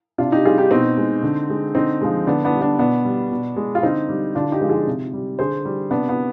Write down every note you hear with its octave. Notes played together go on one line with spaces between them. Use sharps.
C3 D4 F4
D#4 G4
G3 F4 G#4
D#4 G4
B2 C4 D#4
G#3
D3
G#3
D3 C4 D#4
F3 G#3
D3 B3 D4
B3 D4
G3
B3 D4
B2 B3 D4
G3
B2
G#3
F4
D3 C4 D#4
G3
D3 D4 F4
D#4 G4
F3 G#3
F4 G#4
C3
G3
D3 G#4 C5
G3
C3 B3 D4
B3